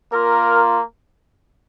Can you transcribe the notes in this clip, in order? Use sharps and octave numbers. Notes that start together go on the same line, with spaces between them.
A#3 F4 A#4